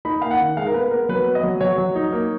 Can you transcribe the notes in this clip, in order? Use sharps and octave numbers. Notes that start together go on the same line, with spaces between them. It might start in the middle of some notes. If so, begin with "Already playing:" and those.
D#4 B5
A#3 F5
F#5
D#3
G#3 F5
A#4
B3 B4
B3 A#4
F#3 B4
B3
D#5
F#3
F#3 C#5
F#3
D#4
A#3